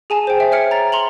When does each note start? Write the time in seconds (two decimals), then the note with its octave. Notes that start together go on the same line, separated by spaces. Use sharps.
0.10 G#4 G#5 A5
0.27 C5 G5
0.40 E5 G5
0.52 C#5 E5 F6 C#7
0.71 A#5 A6
0.92 C6 F7 F#7